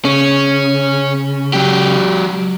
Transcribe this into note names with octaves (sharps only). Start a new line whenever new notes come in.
C#3 C#4
F#3 G4